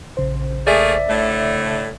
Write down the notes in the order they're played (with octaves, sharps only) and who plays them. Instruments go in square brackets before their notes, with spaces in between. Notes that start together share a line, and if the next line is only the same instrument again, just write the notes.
[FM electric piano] A#1 C#3 C5
[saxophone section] A3 A#3 G#4 [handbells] D5 E5
[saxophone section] A2 D3 A3